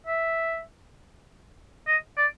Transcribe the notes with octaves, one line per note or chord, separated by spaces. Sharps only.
E5
D#5
D5